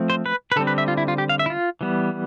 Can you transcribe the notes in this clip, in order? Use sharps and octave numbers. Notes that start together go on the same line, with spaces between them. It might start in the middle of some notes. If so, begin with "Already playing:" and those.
Already playing: F3 A3 C4
C5
B4
B4
D3 G3 C4 A4
B4
E5
F4
E4
F4
G4
F5
E5
E4
F4
E3 G3 B3